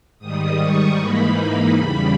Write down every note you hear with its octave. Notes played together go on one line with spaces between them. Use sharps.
G#2 D#3 G3 D#6
C#6
G#2 E3 A#3 D#4 B5
E2 C#3 G3